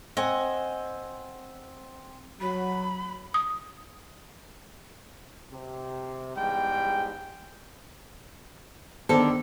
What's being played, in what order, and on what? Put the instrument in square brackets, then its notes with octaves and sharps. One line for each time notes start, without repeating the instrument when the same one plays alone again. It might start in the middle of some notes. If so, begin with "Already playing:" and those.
[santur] C4 [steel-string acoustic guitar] D#5 F#5 G#5
[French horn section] F#3 [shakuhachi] B5
[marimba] D#6
[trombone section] C3
[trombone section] E2 G#2 G3 [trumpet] G5
[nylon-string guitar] D3 D#3 A4 [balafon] B3 C5